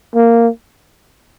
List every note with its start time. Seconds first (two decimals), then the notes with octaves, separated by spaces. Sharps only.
0.15 A#3